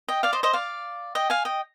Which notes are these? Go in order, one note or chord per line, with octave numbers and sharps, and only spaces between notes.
D#5 G5
D5 F5
C5 D#5
C5 D#5
D5 F5
D#5 G5
F5 G#5
D#5 G5